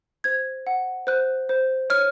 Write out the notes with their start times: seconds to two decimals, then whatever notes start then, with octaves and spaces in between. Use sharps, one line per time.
0.24 C5 G#6
0.67 F#5
1.07 C5 F#6
1.49 C5
1.90 C#5 F6